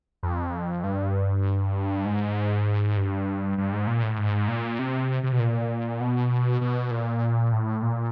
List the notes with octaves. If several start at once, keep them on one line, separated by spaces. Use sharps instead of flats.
F2
G2
G#2
G2
G2
G#2
A#2
A2
G#2
A#2
C3
C3
B2
A#2
B2
B2
A#2
A2
A#2